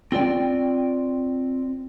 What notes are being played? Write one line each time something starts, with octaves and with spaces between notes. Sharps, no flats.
C4 F4 D5 G5